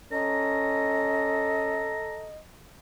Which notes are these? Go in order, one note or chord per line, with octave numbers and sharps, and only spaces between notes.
C#4 A4 D#5 A#5